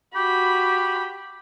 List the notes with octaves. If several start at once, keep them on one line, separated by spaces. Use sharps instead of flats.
F#4 G4 B5